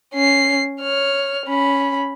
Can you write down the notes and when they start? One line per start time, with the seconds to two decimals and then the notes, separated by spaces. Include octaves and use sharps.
0.14 C#4 C7
0.81 C#5 F6
1.46 C#4 B5